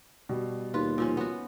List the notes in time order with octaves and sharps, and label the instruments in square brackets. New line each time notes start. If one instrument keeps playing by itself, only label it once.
[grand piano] B2 G3
[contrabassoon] D#2 [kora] F4 B4
[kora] A#2 F3 C#4
B3 F#4